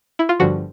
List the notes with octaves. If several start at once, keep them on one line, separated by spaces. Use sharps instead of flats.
E4
F4
G1 G2 D3 F3 F#4